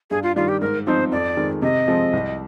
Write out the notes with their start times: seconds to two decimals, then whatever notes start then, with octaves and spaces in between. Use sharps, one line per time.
0.10 G2 G#4
0.23 F4
0.36 D#3 G3 F4
0.48 G4
0.61 G#2 A#4
0.87 F3 C4 D#4 C5
1.12 F2 D5
1.37 D#3 G#3 C4
1.62 C3 D#5
1.88 F3 G#3 C4
2.13 C2